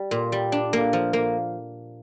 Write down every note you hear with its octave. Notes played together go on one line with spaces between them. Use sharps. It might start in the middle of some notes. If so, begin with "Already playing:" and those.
Already playing: G3
A#2
G3
D4
A#3
F3
A#3